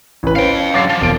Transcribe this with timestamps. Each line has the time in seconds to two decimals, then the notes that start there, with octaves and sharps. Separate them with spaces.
0.23 A1 B4
0.36 C#4 C5 F5 G5
0.74 D3 F#3 D6 A6 C7
0.90 F3
1.01 E1 D7